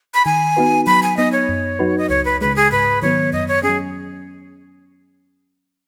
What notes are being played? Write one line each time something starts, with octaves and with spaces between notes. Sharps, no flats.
B5
D#3 G#5
B3 D#4 F#4 B4
F#3 B5
G#5
B3 D#4 D#5
C#5
F#2
F#3 D#4 F#4 B4
D#5
C#2 C#5
B4
C#3 G#3 B4
G#4
G#2 B4
D#3 F#3 B3 C#5
F#2 D#5
C#5
C#4 G#4
F#3